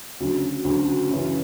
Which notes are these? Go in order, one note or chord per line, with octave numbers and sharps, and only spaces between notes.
D2 C#3 F#3
D2 C#3 F#3
F#2 C#3 E3